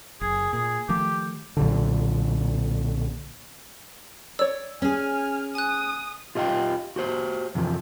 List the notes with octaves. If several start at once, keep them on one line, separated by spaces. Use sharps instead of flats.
F#1 G#4
A#2 G#4
D#3 F3 A3 G4
B1 A#2 D3
C#5 D5 E6
C#4 G#4 G#5 F6
G#5 D#6 F#6
F4 G4 D#5 F5 G5
F#4 G4 C5
F2 C3 E3 F3